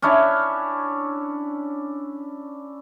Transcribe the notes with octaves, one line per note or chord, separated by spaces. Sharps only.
C#4 D4 E4 C#5